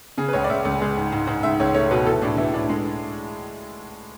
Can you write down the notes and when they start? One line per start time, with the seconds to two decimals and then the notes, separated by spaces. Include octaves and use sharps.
0.18 C#3 G#4
0.28 B4
0.33 C#2 C#5
0.44 D5
0.49 C#2 E5
0.65 C#2
0.81 G#3
0.97 G#2
1.12 G#2
1.27 G#2
1.43 C#2 E5
1.60 C#2 C#5
1.74 A3 C#5
1.91 B2 B4
2.06 E3 A4
2.22 A2 D4
2.37 E3 E4
2.54 A2 D4
2.69 G#3